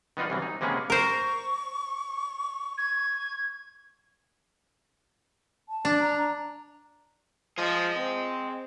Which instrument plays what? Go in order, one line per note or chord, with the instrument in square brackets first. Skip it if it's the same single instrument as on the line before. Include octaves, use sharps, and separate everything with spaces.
[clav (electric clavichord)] D#3 B3 D#4 F4 D5
C2 E3 F#3
D#4
C3 G#3 A#3 B3 C#4 G#4
[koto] A#4 C5 [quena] C#6
[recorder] G#6
[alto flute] A5
[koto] D4
[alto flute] A#5
[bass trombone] F3 [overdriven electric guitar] G#4 D#5
[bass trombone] C4